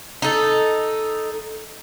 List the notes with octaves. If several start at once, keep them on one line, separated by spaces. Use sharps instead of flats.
D#4 A4